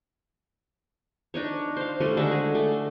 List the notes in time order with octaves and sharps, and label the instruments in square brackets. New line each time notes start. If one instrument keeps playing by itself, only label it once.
[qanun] D4 D#4 C#5
C5 F5
D#3 G3 A3 C#4
D3 G#3 F#4 E5
G#4
A3